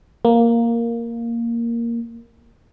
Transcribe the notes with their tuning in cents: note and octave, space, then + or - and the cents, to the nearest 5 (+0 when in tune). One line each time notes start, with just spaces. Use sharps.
A#3 +0